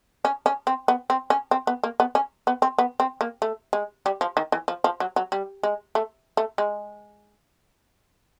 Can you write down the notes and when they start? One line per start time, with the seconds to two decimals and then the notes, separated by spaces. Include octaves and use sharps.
0.25 C#4
0.46 C#4
0.67 C4
0.88 B3
1.10 C4
1.30 C#4
1.51 C4
1.67 B3
1.84 A#3
2.00 B3
2.15 C#4
2.47 B3
2.62 C4
2.79 B3
3.00 C4
3.21 A#3
3.42 A3
3.73 G#3
4.06 G3
4.21 F3
4.37 D#3
4.52 E3
4.68 F3
4.84 F3
5.00 F#3
5.16 F#3
5.32 G3
5.63 G#3
5.95 A3
6.37 A3
6.58 G#3